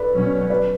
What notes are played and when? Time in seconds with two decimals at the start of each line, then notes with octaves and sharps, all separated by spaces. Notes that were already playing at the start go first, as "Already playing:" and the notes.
Already playing: A4 B4 D5
0.12 B2 F#3 C#4
0.50 B4 D5